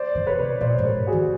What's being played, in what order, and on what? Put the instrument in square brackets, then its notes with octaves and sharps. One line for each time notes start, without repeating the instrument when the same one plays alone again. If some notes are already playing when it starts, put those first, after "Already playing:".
Already playing: [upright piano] C5 D5
[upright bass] D3
[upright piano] B4 C#5
[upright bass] C3
[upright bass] A#2 [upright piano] C5 D5
[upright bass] G#2
[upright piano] A#4 C5
F#4 G#4
[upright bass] D#3